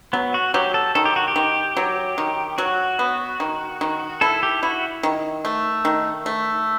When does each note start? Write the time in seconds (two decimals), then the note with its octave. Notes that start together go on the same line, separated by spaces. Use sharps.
0.13 F#3 B3
0.34 F#4
0.54 F#3 G4
0.74 A4
0.95 D#3 A4
1.05 G4
1.16 F#4
1.28 G4
1.36 D#3
1.77 F#3
2.18 D#3
2.58 F#3 F#4
2.99 B3
3.40 D#3
3.81 D#3
4.21 E4 A4
4.43 G4
4.63 E4 F#4
5.03 D#3
5.45 A3
5.85 D#3
6.26 A3